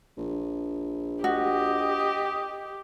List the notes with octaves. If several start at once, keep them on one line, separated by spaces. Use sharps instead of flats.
A#1
F#4 G4 D#5